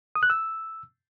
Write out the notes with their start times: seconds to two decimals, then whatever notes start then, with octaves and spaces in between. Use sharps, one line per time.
0.15 D#6
0.23 F#6
0.30 E6